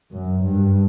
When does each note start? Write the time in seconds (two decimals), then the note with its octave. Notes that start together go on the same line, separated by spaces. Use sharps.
0.12 F#2
0.43 G2